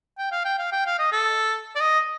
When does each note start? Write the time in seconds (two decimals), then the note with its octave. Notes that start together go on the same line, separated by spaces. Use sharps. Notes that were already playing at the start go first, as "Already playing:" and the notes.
0.18 G5
0.32 F5
0.45 G5
0.58 F5
0.72 G5
0.86 F5
0.99 D#5
1.12 A4
1.76 D5
1.80 D#5